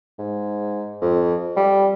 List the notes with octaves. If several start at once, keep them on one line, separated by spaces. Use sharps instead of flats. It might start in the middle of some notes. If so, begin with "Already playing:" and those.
G#2
F2
G3